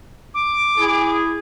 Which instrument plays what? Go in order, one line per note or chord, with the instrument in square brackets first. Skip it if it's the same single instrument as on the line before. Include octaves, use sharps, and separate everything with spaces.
[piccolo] D6
[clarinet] E4 [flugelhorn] G#4